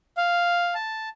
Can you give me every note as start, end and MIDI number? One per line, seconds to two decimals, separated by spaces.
0.17 0.74 77
0.74 1.09 81